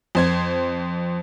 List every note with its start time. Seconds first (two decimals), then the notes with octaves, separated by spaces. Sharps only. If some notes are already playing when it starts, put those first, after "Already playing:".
0.15 F2 C5 G#6